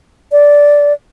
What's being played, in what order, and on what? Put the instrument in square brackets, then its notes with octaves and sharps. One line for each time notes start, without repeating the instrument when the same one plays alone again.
[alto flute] D5